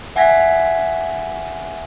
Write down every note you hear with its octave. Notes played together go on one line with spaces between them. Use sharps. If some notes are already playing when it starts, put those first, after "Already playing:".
E5 F#5 G#5 G#6 A#6 B6